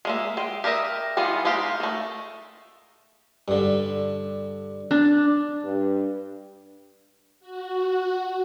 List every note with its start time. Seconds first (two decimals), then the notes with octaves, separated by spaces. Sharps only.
0.05 G#3 A#3 E5
0.37 G#3 G5
0.64 G4 A#4 C5 D#5 E5
1.17 D#3 E3 G3 B3 F4
1.45 G#3 D#4 F4 G4
1.80 D#3 A3
3.48 G2 D3
4.91 D4
5.64 G2
7.40 F#4